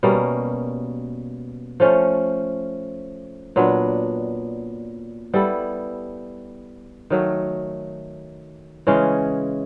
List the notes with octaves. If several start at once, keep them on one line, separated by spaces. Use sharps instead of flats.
B2 G3 A#3 C#4
F3 A3 C#4
A#2 F#3 B3 D4
G3 B3 E4 A4
D#3 F#3 A3
C#3 E3 G#3 C#4